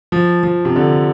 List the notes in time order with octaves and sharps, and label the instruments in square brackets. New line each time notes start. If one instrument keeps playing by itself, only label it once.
[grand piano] F3
F3
C3
D3